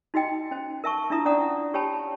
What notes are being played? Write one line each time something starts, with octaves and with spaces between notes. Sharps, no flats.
D#4 F#4 D#5 G5
C#4 C5
A#4 E5 A5 C#6
D4 E4 F4 E5 A#5 D#6
C#4 D4 D5 F#5 A#5 D#6
G4 C#5 G5 A5 B5